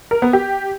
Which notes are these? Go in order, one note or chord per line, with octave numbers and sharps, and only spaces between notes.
A#4
B3
G4